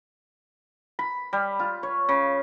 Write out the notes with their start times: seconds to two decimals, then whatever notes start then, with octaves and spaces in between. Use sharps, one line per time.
0.99 B5
1.33 G3
1.59 F4
1.83 C#5
2.09 C#3